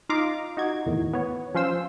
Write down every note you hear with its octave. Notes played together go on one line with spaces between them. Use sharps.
D#4 F4 F5 A#5 D6
D#4 F#4 G#6
E2 A2 D#3
B3 C#5
F3 C#4 F4 C5 E6